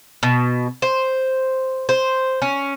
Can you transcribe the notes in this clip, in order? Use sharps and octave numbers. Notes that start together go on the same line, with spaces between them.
B2
C5
C5
C#4